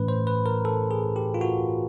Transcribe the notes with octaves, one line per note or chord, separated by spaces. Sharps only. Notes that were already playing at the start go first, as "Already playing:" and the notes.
Already playing: A2 E3 A3 C#4 B4
C5
B4
A#4
A4
G#4
G4
F4
F#4